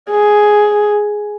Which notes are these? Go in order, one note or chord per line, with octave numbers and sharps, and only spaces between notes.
G#4